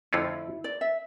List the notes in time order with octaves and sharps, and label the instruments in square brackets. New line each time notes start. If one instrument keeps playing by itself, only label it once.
[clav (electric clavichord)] F2 D3 A3 C#4 F4 [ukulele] E4
[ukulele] D5
E5